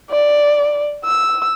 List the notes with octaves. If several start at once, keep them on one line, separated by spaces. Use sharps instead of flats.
D5
E6